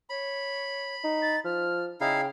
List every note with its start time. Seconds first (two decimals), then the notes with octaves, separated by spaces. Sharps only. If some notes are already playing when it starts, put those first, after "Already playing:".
0.10 C#5 B5
1.04 D#4
1.22 A6
1.45 F3 F6
2.01 C#3 D#4 E4 F5 G5